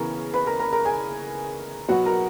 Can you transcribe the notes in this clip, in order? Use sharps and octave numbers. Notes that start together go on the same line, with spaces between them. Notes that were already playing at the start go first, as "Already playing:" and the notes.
Already playing: C#3 E3 B3 A#4 A#5
B4 B5
A#4 A#5
A#4 A#5
A#4 A#5
G#4 G#5
B2 F#3 B3 F#4 F#5
A#4 A#5